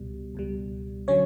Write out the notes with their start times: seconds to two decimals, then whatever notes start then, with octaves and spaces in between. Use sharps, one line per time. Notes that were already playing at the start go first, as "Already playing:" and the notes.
Already playing: C#2 B2 G3
0.35 C#2 B2 G3
1.08 D3 F#3 C#4 C#5